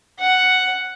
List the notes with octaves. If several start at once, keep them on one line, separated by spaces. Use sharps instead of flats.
F#5